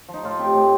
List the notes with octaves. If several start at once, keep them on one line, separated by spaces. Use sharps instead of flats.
F3
D#4
A2 F4
C4 G4
A2